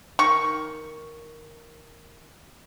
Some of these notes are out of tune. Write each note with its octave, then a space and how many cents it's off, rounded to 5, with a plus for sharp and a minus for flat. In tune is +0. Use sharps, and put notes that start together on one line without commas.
D#3 +0 C#6 +0